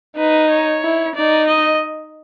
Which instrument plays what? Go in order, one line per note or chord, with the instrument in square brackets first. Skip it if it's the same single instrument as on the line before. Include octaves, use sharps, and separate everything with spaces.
[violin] D#4 [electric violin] B4
[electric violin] C#5
[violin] E4
[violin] D#4 [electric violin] D5
[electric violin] D#5